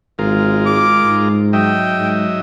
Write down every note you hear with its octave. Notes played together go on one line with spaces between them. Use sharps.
G#1 G#3 F4 A#4
D6
G#2
F#3 D#5 E5 G5
G#2